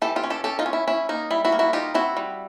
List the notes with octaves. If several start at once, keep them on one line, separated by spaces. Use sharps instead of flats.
E3 G4 A4
F4 G4
C#4
G4 A4
C#4 G4 A4
D#4 F4
C#4
E4
C#4 E4
A#3 D#4
G3 E4
E4 F#4
A#3
E4 F#4
D#4 F4 G4
C4 E4 F#4
G3